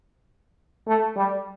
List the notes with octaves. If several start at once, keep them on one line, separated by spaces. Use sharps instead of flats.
A3
G3